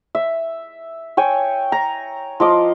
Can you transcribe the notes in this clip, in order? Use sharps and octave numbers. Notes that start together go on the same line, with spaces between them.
E5
C#5 G5 G#5
A#5
F3 D#5 D6